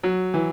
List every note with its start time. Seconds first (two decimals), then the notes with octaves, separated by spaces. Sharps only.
0.03 F#3
0.34 E3